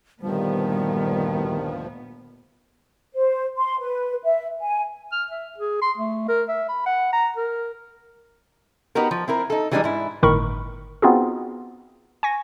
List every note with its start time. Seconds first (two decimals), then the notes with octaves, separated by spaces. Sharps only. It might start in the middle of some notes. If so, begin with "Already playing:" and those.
0.22 D2 G2 A#2 D#3 F3 G3 B3
3.13 C5
3.56 C6
3.80 B4
4.24 E5
4.60 G#5
5.12 F6
5.31 E5
5.58 G#4
5.82 C6
5.98 A3
6.28 A#4
6.49 E5
6.69 B5
6.86 F#5
7.13 A#5
7.36 A#4
8.95 B3 D#4 F#4 G4 A#4
9.11 F3
9.28 C4 E4 A#4
9.50 D#4 A4
9.71 E3 G3 G#3 A#3 D4 D#4
9.84 G#2 E4
10.23 G1 A2 D#3 A#4 B5 C#6
11.02 B3 C4 D#4 F4 F#4 G#4
12.23 G#5 C#6 A#6